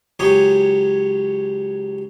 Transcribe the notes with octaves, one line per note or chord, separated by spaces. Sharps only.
C#2 F#3 C#4 G4 C#5 D#6